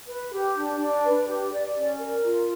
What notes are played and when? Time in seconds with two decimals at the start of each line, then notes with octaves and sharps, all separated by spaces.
0.09 B4
0.33 G4
0.56 D4
0.80 D4
1.04 B4
1.27 G4
1.52 D5
1.76 C#4
1.99 A#4
2.24 F4